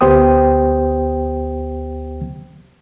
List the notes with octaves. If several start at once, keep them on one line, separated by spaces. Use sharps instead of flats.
D2 B3 G4 C5 G5 D#6